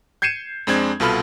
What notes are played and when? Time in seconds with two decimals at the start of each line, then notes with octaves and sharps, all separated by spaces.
0.22 G6 G#6 C7 C#7 D#7 E7
0.67 F2 G#3 C4 D4 G#6
1.00 C2 B2 F4 A4 B5 F6